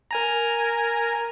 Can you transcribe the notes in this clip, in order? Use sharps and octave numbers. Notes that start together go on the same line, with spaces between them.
A#4 G#5 A#5